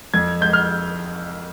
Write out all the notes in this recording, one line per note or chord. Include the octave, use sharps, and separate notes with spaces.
F2 G#6
G#3 G6
F6